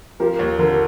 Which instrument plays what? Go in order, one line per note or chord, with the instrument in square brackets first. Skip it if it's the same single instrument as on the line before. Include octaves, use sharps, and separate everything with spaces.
[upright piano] F3 [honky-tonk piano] G4 A#4
[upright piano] D#2
[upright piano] D3 [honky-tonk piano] G4 A#4